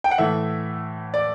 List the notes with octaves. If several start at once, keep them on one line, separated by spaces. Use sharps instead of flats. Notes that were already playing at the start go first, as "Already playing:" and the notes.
G5
F#5
A2 E3 A3 E5
D5